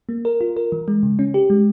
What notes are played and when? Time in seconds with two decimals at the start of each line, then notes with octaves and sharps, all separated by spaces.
0.09 A#3
0.25 A#4
0.41 F4
0.57 A#4
0.72 E3
0.88 G#3
1.03 C#3
1.19 C#4
1.34 G4
1.50 G#3